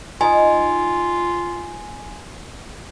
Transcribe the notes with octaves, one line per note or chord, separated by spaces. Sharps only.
D#4 F4 G#5